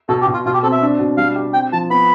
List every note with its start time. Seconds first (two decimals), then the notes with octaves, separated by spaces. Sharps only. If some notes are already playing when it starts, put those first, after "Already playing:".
0.09 B2 A4
0.21 G4
0.27 B2
0.33 F4
0.45 B2 F4
0.54 G4
0.63 C4 A4
0.72 E5
0.82 D4
0.99 B2
1.17 G3 F5
1.36 G4
1.53 C4 G5
1.73 F3 A5
1.90 B3 B5